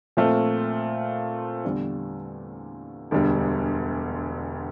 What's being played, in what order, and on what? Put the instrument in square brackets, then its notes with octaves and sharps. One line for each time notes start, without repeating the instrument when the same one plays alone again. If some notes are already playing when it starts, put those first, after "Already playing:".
[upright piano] A#2 F3 A3 C4 F4
E2 D3 G3
E1 D2 D3 G3